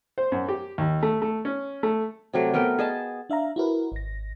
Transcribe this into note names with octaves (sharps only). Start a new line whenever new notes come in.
C5
F#2
G4
D#2
A3
A3
C#4
A3
C3 F#3 A3
A3 B3 A#4 G5
G#4 D#5 A5
D4 E5 F5 A#5
E4 F#4 A#4 B4
G#1 A#6